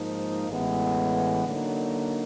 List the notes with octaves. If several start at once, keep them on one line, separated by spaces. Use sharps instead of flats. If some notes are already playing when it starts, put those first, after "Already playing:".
Already playing: G#2 F3 A#3 D#4
A1 A2 E3 G#3 B3
D3 F#3 A#3 D#4